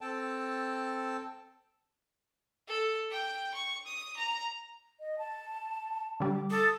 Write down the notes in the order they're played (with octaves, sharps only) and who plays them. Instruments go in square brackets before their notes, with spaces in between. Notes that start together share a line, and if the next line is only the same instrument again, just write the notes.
[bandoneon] C4 A4 G5 A5
[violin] A4
G5
C#6
D#6
A#5
[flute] D#5
A5
[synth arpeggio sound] D3 G3 [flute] D6
[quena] A4 [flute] D#6